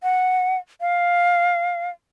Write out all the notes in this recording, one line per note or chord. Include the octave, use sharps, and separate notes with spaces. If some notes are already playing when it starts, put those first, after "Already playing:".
F#5
F5